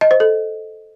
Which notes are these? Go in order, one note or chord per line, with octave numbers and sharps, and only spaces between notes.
D#5
C5
A4